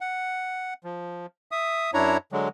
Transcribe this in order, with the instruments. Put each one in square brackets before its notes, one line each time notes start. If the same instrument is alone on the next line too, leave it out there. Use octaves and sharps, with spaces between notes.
[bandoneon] F#5
F3
E5 D#6
F#2 D4 E4 C#5 A#5
D3 F#3 G#3